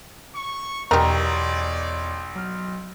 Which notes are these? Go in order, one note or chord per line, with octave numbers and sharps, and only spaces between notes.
C#6
B1 E2 G4 A#4 C#5 D5
F#3 F6